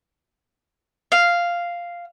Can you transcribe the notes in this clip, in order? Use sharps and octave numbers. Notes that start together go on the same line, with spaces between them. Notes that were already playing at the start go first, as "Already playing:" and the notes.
F5